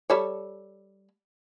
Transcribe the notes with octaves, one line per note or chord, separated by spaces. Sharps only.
G3 A4 C#5